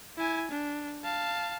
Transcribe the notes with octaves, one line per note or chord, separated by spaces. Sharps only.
E4 G#5
D4
F5 A5